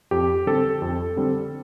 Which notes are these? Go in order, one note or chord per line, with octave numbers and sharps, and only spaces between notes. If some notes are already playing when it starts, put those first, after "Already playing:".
F2 G4
D3 G3 C4 A4
F2
D3 G3 C4